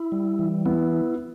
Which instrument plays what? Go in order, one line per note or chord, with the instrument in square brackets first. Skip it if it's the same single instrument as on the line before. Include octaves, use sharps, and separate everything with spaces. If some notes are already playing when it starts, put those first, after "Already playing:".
Already playing: [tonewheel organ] E4
G3
E3
[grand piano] B3 [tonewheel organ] E4